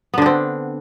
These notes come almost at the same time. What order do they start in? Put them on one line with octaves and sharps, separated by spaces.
B3 D3 D4 C4